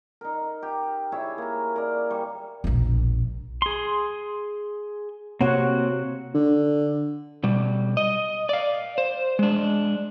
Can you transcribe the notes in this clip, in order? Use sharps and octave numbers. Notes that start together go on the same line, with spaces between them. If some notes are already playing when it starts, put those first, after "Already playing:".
D#4 A#4
G4
E4 G#4 C#5 E5
A#3 A#4
A#4 D5
G3 C#6
E1 A#1
G#4 C6
C3 A#3 C4 F#4 C#5 F#5
D3
B2 G3
D#5
D5 F5
C5
G#3 D4